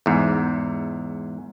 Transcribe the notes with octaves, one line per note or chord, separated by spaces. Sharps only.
E2 G#2